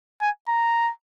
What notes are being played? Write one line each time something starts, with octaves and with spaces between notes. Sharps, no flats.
G#5
A#5